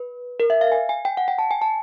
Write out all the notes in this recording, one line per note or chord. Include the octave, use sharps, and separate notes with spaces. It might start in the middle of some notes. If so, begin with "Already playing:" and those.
Already playing: B4
A#4
E5
F5
G#5
G#5
G5
F#5
G5
A5
G#5
A5